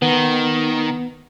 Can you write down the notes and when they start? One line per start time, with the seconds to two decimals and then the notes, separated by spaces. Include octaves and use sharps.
0.02 D#3 B3